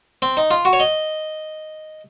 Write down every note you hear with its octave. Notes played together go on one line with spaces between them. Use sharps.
C4
D#4
F4
F#4
C#5
D#5